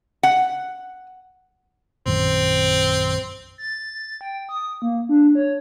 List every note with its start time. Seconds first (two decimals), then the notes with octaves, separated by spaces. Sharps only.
0.23 F#5
2.06 A#1 F#2 D#3 C4
3.58 A6
4.21 G5
4.49 D#6
4.82 A#3
5.09 D4
5.35 C#5